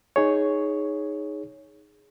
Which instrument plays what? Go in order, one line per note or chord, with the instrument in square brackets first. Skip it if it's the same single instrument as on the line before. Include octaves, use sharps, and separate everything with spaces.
[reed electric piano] D#4 G#4 C#5